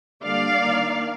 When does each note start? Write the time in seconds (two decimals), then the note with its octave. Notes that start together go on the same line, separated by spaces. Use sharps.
0.23 D3 G3 A#3 D5 F5
0.58 D#3 A#3 D4